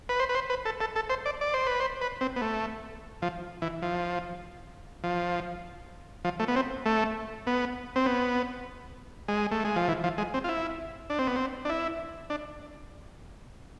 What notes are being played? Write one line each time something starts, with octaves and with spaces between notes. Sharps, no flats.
B4
C5
B4
C5
B4
A4
A4
A4
C5
D5
D5
C5
B4
C5
B4
C4
B3
A3
F3
E3
F3
F3
F3
A3
B3
C4
A3
B3
C4
B3
G#3
A3
G#3
F3
E3
F3
G#3
C4
F4
E4
D4
C4
B3
C4
D4
E4
D4